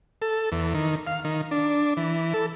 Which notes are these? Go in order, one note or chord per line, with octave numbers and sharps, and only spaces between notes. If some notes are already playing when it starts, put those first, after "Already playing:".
A4
E2
D#3
F5
D#3
D4
E3
A4